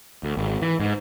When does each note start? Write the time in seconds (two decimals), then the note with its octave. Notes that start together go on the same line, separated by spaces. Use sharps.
0.23 D2
0.37 G#1
0.62 E3
0.80 G#2